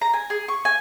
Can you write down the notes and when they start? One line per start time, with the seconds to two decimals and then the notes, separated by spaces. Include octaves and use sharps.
0.01 A#5
0.13 G#5
0.30 G#4
0.48 C#6
0.65 G#5